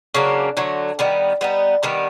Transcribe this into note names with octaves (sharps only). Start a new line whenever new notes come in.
C#3 F#3 A#3 D4
D3 F#3 A3
D#3 G3 B3
G3 B3 D#4
D#3 G3 B3 D4